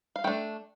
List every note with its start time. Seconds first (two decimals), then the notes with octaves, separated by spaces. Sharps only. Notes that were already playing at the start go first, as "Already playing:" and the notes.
0.16 F5
0.24 A3 D4 G5